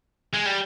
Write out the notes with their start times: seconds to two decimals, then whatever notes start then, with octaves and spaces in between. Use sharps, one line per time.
0.34 G#3
0.46 G3